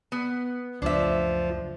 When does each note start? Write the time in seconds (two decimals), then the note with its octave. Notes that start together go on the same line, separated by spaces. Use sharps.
0.12 B3
0.82 C#2 F#2 F3 A3 D4 E5